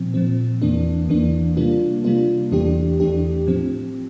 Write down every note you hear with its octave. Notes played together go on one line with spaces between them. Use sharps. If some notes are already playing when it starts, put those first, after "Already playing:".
Already playing: A#2 F3 C4
A#2 F3 C4
E2 E3 A#3 D4
E2 E3 A#3 D4
C3 G3 A#3 D4 F4
C3 G3 A#3 D4 F4
E2 E3 A3 D4 G4
E2 E3 A3 D4 G4
A2 F3 C4